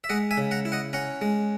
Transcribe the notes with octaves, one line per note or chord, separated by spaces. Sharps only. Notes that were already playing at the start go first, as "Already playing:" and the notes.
E5
G#3 D#5 F#5
E5 G#5
C#3
F#5 A#5
E4
D#5 F#5
C#4 F#5 A#5
G#3